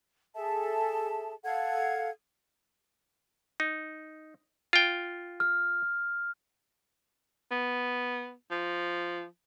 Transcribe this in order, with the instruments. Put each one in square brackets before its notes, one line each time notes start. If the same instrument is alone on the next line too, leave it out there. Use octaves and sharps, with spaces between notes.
[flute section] G#4 A4 E5 A5
A4 F5 F#5 G#6
[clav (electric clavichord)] D#4
F4 G5
[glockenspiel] F6
[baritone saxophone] B3
F3